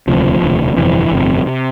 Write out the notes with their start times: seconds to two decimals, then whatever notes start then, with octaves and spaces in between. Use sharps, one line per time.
0.07 E1 D2 C3 F3
0.42 E1 D2 C3
0.77 G1 F2 C3 E3
1.12 G1 F2 C3
1.46 C3